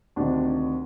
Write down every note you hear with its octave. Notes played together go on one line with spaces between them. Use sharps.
D2 C3 D#3 D4